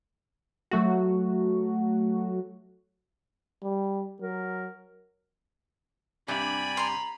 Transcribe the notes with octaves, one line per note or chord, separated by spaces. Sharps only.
F#3 A3 F#4
G3
F#3 A#4
G2 C3 D5 G#5 B5
A#5 C6